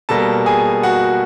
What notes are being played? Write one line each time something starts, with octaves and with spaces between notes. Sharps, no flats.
B2 G3 A#3 A4 A5
G#4 G#5
F#4 F#5